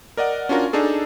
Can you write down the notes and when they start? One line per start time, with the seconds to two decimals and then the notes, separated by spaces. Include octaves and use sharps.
0.17 A#4 D5 D#5 F#5
0.49 C#4 D4 F4 F#4 A#4
0.73 D4 D#4 G#4 A4